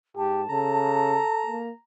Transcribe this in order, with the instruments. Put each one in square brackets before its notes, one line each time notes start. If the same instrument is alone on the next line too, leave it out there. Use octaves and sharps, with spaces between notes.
[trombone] G#2 [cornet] G4 [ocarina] A5
[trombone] C#3 [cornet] A4 [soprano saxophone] A#5
[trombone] A#3